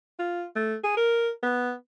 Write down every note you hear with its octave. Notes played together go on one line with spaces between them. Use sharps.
F4
A3
G#4
A#4
B3